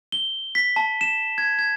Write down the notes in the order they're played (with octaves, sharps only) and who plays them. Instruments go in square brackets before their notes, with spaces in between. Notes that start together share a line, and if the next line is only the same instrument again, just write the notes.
[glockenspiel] G7
B6
A5
E7
G#6
G#6